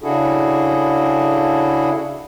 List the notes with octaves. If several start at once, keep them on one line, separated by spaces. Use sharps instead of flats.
C#3 D4 E4 F#4 G#4 A4